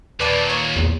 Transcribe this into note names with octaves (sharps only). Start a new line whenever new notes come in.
D#2 A#2 B4 D5 A5
C#5
A#1 E2